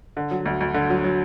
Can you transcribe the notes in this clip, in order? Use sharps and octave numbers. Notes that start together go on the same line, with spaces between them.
D3
F#3
D2
D2
D3
F#3
F#3